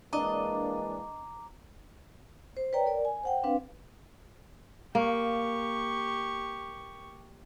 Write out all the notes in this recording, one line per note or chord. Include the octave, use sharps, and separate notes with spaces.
E3 G#3 A#3 D4 D#5 A#5 D6
C5
B4 C#5 D5 G5 A#5
A#4 D5
G#5
C5 F#5 G5
C4 D4 B4 F5
A#3 G4 C#6